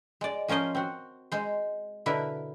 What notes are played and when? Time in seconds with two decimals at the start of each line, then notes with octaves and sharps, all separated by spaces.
0.21 G#3 D5
0.48 F3 C#4 A#4 C5 D#5
0.75 C4 F#4
1.32 G#3 C5
2.06 B2 D3 E4 A#4 B4